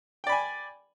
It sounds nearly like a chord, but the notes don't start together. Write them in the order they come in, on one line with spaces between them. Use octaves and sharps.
G5 D5 B5 G#5